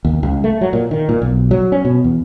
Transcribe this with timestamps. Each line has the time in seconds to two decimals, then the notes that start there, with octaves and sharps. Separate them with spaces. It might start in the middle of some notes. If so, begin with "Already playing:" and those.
0.05 D#2
0.23 C#2
0.44 A3
0.61 F#3
0.73 A#2
0.91 D#3
1.09 A#2
1.22 B1
1.51 F#3
1.72 C#4
1.85 B2
2.04 E2